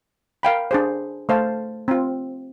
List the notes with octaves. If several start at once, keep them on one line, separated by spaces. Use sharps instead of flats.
A#4 F5 G5 B5
D4 G#4 C5
A3 C5 F5 A5
C4 F4